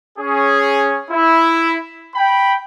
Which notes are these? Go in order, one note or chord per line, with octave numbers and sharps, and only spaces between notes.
C#4 G#4
E4
G5 B5